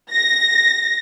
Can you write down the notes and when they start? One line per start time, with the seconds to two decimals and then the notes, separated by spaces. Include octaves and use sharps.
0.11 A#6